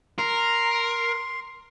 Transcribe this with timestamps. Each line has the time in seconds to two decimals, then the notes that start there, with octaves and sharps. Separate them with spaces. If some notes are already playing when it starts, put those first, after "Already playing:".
0.19 A#4 C6